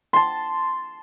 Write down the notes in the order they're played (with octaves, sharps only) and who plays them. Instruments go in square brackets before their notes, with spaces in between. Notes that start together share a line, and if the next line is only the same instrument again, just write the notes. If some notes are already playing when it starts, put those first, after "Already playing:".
[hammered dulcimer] A5 C6